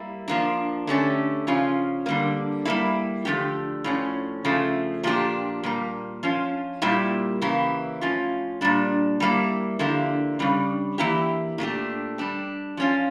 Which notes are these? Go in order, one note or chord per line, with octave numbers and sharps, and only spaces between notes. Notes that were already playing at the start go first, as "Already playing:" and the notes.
Already playing: G3 A#3 E4
F3 A#3 D4
D3 A3 C#4 G4
C#3 F3 C#4 F4
D3 G3 A#3
G3 A#3 E4
D3 F3 A3 E4 G4
A2 F3 C#4
C#3 F3 A3
A#2 F3 A#3 D4 G4
A#2 G3 A#3
F3 C#4 F4
A#2 G3 A#3 E4 G4
C#3 E3 A#3 E4 G4
A2 F3 C#4 F4
A#2 G3 D4
G3 A#3 E4
D3 F3 A#3 E4 G4
C#3 G3 D4
E3 A#3 E4 G4
A#2 A3 D4 G4
G3 D4 G4
F3 C#4 F4